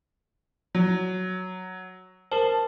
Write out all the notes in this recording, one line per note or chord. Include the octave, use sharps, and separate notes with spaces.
F#3
A#4 C5 A5